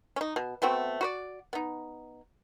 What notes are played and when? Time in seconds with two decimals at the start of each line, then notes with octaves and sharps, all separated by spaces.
0.16 C#4 D#4
0.36 B2
0.62 A3 B3 C4 F#4
1.01 F#4 B4 D5
1.53 B3 D#4